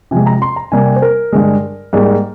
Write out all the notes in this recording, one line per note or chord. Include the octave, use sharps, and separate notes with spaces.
C3 F3 G#3 G#5
A#5
C6
A#5
C3 G3 A#3 G#5
C5
A#4
G2 D3 G#3
G#2 G3 A#3